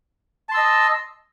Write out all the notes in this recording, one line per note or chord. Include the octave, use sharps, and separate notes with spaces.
D#5 A5 C6 E6